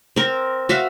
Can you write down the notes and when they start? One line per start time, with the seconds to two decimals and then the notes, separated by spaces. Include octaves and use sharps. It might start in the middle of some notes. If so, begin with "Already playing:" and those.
0.16 C4 A#4
0.69 F#4 E5 F5